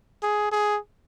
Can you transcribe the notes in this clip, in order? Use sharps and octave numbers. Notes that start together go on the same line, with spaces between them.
G#4
G#4